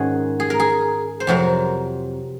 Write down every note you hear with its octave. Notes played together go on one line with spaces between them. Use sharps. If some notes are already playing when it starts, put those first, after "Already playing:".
Already playing: G#2 D#3 G#3 C#4 F#4 G#4
G#4
A#4
G#4
C5
F2 C3 F#3 A#4